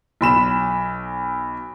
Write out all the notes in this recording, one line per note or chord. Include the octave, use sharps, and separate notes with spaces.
B1 B5 E7